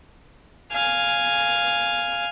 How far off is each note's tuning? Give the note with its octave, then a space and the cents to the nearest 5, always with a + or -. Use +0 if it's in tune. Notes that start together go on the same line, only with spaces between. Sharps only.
F5 +0 G#5 +0